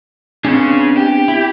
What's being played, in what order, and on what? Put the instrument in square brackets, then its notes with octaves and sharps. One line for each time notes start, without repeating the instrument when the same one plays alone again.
[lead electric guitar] C#3 G#4 [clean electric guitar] B3 C4 D4
[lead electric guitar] G4
[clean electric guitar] E4